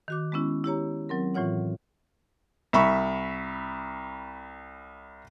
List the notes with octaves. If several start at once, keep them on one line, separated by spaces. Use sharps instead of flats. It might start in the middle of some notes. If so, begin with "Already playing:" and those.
D#3 F#4 D6
G#3 B3 C#4 E4
E4 G4 C#5 A#5
F#3 C4 A#4
A2 E3 F4 C#5 F#5
C2 E5 B5 C#6